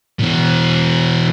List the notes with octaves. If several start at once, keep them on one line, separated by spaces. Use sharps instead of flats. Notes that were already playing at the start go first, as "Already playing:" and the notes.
B2 E3